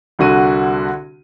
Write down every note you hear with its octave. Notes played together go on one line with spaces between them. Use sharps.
C2 D3 F#4 D#7